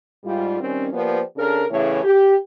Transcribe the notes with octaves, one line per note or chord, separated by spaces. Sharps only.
G#2 G3 F4
D#3 G3 C4 C#4
F3 A#3 B3 G4 C5 D5
C#3 D4 A4 A#4
E2 A2 C#3 E3 A3 C#5
G4